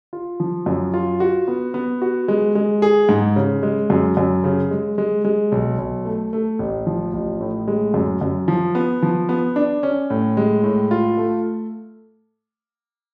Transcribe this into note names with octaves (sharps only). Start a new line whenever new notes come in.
F4
F3
F#2
F4
F#4
B3
B3
F#4
G#3
G#3
G#4
G#2
C#3
G#3
F#2
F#2
C#3
G#3
G#3
G#3
B1
B1
A3
A3
A1
F3
A1
A2
G#3
F#2
F#2
F3
B3
F3
B3
D4
C#4
A2
G#3
A2
F4
A3